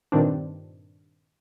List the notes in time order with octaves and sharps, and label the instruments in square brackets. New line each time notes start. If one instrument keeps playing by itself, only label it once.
[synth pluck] G2 A#2 D#3 C4 D4